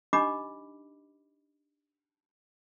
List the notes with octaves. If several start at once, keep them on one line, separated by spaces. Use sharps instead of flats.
D4 D#4 G4 D#5 B5 D6